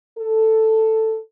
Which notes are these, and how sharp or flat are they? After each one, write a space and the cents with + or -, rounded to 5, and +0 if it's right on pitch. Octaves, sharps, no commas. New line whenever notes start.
A4 +5